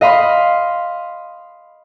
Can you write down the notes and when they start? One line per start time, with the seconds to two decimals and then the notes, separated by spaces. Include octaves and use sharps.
0.01 D#5 F5 B5 C6